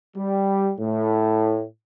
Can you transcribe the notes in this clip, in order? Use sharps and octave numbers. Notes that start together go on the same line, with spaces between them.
G3
A2